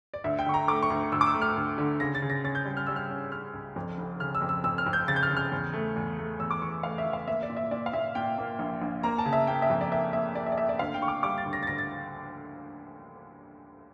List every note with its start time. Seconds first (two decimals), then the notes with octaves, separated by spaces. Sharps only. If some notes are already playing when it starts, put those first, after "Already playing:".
0.14 D5
0.24 D2 E5
0.39 G5
0.46 D3 C#6
0.54 A#5
0.68 A3 D6
0.83 C#6
0.90 D2
1.12 D2 E6
1.21 D6
1.26 E6
1.34 A3
1.42 F6
1.56 D2
1.78 D3
2.00 C#3 A#6
2.15 A6
2.22 C#3
2.30 A#6
2.44 C#4 A6
2.55 G6
2.65 G3
2.77 F6
2.86 G3 E6
2.96 F6
3.10 C#4
3.32 C#4 F6
3.54 C#2
3.76 F2
3.98 F1
4.20 C#3 F6
4.35 E6
4.42 F2
4.49 E6
4.64 F2 E6
4.78 F6
4.86 F2
4.93 G6
5.08 C#3 A6
5.16 G6
5.23 F6
5.30 C#3
5.37 F6
5.52 E2
5.73 A3
5.96 E2
6.18 A3
6.40 E2 E6
6.51 D6
6.61 E3 C#6
6.83 A3 F5
6.98 E5
7.05 E3
7.13 F5
7.28 A#3 E5
7.43 D5
7.50 A#2
7.57 E5
7.71 A#2 D5
7.86 F5
7.93 A#2 E5
8.15 A#2 G5
8.38 A#3
8.59 A#1
8.82 A#1
9.03 A#3 A#5
9.18 A5
9.26 C#3
9.33 E5
9.47 A#3 G5
9.62 E5
9.70 F2
9.81 D5
9.91 A#3 E5
10.13 A#3 E5
10.35 A#3 D5
10.46 E5
10.52 D5
10.58 A#3 E5
10.69 D5
10.79 D2 F5
10.94 G5
11.01 D2 C#6
11.08 D6
11.23 G3 D6
11.38 A6
11.46 D2
11.53 A#6
11.63 A6
11.67 D2 A#6
11.78 A6